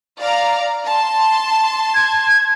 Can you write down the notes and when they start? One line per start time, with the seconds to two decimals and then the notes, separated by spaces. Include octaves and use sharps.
0.19 D5 F5 A#5
0.85 A5 C6
1.95 G#6